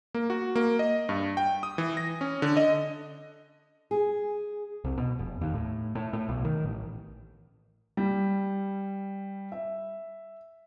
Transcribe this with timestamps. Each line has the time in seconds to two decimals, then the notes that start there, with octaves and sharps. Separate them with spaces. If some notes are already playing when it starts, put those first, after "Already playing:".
0.15 A#3
0.30 F#4
0.56 A#3
0.79 D#5
1.09 G2
1.37 G5
1.63 D#6
1.78 E3
1.97 A#6
2.21 C#4
2.42 D3
2.57 D#5
3.91 G#4
4.84 C2
4.98 B2
5.19 F1
5.41 D#2
5.54 A2
5.95 A2
6.13 A2
6.29 B1
6.45 D#3
6.64 A1
7.97 G3
9.52 E5